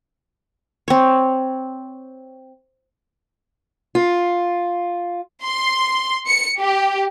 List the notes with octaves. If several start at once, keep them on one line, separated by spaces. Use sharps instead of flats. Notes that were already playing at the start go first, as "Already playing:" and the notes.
C4 C#5
F4
C6
C#7
G4